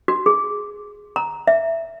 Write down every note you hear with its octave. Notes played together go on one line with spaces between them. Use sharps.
F#4
G#4
A#5
E5